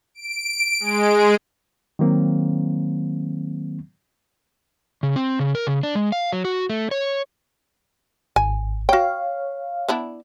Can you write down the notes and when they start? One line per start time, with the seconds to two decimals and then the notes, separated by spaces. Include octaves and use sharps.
0.15 D7
0.80 G#3
1.99 D#3 F#3 A#3 C4
5.03 C#3
5.16 C4
5.39 C#3
5.55 A#4
5.67 C#3
5.83 D4
5.95 G#3
6.12 F5
6.32 F#3
6.45 F#4
6.70 A3
6.91 C#5
8.36 G#1 G#5
8.89 F#4 C#5 F5 G5
9.88 B3 D4 E4